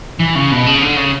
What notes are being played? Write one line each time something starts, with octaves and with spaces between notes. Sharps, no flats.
E3
C#3
B2
C#3
D3
C#3